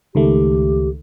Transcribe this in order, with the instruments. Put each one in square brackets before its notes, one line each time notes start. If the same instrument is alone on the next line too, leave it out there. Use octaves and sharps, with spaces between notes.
[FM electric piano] C#2 D#3 A3 [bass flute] G4